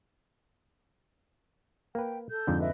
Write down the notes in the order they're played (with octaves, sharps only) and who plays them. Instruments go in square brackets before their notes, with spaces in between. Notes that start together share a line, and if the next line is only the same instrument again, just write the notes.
[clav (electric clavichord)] A#3 B4 [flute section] G5
[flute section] A4 G6
[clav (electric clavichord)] F2 G#2 D3
[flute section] B4 D#5 E5